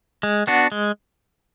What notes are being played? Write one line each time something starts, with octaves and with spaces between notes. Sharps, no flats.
G#3
B3 D4 F#4
G#3